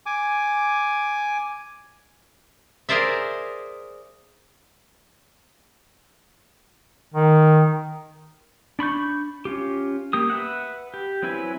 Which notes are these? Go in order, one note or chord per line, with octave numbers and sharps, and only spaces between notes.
G#5 D6
G#4 A#4 C5 D5 E5
D#3
D4 B5 C#6 G6
C#4 F4 G4
A#3 G4 D#6
B4 E5 F#5
G4
F#3 C4 E4 B4 G#5